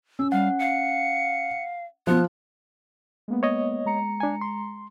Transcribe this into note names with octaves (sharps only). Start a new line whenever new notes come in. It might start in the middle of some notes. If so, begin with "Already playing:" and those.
C#4 E6
G3 F5 F#5
F5 C#7
F3 B3 F4 F#6
G#3 A#3 B3
C#5 D#5
G#3 A#5 C#7
D4 G#5
C6